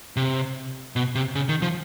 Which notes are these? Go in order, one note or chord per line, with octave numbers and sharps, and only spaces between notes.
C3
B2
C3
C#3
D#3
F3